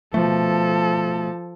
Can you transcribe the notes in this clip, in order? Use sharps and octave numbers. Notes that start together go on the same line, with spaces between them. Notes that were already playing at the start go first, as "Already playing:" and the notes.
B2 F3 A3 A4